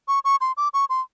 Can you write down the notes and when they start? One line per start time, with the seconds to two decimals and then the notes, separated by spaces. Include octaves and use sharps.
0.08 C#6
0.25 C#6
0.41 C6
0.57 D6
0.74 C#6
0.90 C6